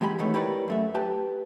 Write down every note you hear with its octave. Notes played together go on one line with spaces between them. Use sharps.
E2 G#3 G4 G5 B5
E2 C3 D#3 A3 B3 C#5
E4 G4 A#4 B4 C#5 D5
F#2 A3 E5
G4 B4 A5